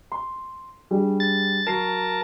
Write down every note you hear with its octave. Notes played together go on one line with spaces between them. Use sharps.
C6
G3 D4 G#4
A6
F#3 A#4 A5 C7